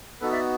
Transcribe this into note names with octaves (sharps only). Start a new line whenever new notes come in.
B3 D#4 F#4 A4 B4
D5 E5